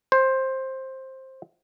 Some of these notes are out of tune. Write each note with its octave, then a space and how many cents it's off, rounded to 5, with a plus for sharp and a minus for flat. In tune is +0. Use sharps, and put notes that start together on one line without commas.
C5 +15